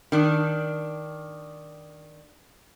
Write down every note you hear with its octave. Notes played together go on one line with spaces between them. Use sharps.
D#3 D4